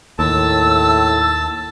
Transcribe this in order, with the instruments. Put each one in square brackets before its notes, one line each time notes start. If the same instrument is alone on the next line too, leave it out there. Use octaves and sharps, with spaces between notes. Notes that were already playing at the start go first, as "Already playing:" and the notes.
[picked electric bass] D#2 [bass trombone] A2 [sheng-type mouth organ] A5 [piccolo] E6